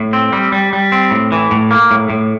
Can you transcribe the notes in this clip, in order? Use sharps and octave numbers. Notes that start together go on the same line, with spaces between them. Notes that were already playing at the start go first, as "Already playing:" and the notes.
Already playing: A2
C4
G3
G3
G3
C4
A2
E3
A2
A#3
A2
A2